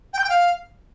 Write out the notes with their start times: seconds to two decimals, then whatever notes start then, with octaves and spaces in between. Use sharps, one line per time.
0.13 G5
0.19 G6
0.24 G5
0.29 F5